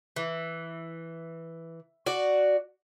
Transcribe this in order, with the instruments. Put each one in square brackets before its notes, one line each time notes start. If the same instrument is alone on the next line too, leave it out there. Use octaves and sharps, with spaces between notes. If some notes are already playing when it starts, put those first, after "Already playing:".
[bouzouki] E3
F#4 D5